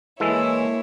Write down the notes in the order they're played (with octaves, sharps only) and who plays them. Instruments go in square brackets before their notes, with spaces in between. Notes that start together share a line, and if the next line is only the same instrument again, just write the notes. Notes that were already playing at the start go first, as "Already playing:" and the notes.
[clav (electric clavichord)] E3 G#3 A4 [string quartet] A#3 E4 C#5